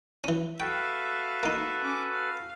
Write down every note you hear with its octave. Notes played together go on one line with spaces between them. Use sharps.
E3 C#4
F#4 A4 B4 E5 F5 G5
A#3 D#4
C#4 D6
F5